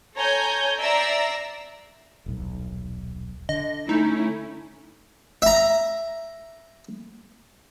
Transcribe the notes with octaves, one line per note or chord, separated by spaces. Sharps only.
A4 C#5 G#5 A#5 G6
D5 E5 A#5 E6 C7
D#1 B1
D3 D#5
A3 C#4 D#4 E4
E5 A#5